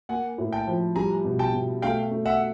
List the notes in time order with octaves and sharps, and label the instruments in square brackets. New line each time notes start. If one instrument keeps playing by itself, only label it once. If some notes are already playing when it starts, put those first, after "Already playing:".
[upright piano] A#3 [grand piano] F#5 G#5
[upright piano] A2
[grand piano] G5 A5
[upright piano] F3
[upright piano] G3 [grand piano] G#5 A#5
[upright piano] B2
[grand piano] G5 A5
[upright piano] B2
[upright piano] A3 [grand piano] F5 G5
[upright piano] A3
[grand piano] E5 F#5